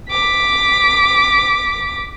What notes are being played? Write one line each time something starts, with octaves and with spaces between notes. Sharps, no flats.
D6 B6